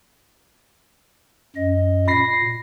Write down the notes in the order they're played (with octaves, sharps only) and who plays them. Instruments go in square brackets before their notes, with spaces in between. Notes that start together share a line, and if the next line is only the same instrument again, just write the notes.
[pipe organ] F#2 D#5
[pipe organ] A#2 [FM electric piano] B5 A#6 C7